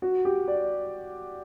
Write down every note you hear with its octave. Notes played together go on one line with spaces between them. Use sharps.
F#4
G4
D5